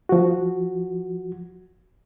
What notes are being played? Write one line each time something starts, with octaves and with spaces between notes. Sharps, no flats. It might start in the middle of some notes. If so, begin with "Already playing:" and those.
F3 F#4